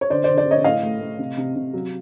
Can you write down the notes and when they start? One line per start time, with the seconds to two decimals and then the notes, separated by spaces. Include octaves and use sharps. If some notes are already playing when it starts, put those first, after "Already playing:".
0.01 C#5
0.10 D3 C5 D5
0.24 C5 D5
0.29 D3
0.38 C5 D5
0.47 D3 C#5 D#5
0.64 A2 D#5 F5
0.83 A3
1.01 A3
1.19 C3
1.37 C3
1.55 C3
1.73 F#3